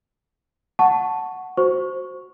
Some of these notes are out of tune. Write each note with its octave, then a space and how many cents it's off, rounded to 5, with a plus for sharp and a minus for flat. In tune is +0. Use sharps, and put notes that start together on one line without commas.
F#5 +0 A5 +0 C#6 +0
F#4 +0 C5 +0 C#6 +0